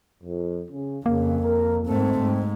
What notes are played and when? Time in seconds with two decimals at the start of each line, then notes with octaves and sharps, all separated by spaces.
0.23 F2
0.71 C#3
1.06 F2 C#3 A#3
1.43 A#4
1.87 G#2 A3 C4
2.20 G#2